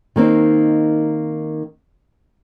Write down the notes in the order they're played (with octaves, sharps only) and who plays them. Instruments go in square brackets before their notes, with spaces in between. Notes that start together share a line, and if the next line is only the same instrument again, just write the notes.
[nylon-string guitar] D#3 A#3 C4 D#4